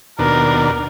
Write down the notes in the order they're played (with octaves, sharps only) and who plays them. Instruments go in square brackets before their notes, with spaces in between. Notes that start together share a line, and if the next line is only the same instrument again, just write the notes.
[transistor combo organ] D#2 B2 D4 [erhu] A#4